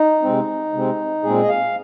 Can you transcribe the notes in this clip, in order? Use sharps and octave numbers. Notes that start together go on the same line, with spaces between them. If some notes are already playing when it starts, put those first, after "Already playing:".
Already playing: D#4
C3 G#3 C4
C3 G#3 C4
A#2 G#3 C4 G#4
D#5
F5